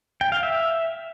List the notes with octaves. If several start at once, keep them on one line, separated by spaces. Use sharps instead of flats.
G5
F5
E5